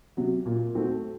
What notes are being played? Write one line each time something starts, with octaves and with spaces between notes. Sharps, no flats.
C3 F#3
A#2
A3 C4 F#4